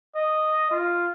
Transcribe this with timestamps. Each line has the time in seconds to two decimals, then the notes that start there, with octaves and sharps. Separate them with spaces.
0.15 D#5
0.71 F4